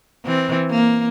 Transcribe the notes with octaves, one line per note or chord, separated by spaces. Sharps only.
E3 C4
A#3